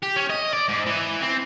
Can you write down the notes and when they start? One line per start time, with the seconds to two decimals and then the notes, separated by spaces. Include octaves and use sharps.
0.03 G4
0.16 C#4
0.30 D#5
0.53 D5
0.69 G#2
0.86 E3
1.22 C4